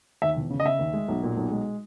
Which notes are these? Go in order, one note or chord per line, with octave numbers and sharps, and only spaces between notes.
D#2 E5
E1
C#3
D#5
C#3 E5
D#2
G#3
B1
A#2
B1
G#3